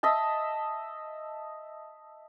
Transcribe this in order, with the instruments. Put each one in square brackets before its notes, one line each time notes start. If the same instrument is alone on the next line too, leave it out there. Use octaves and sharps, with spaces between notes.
[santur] D#5 E5 A5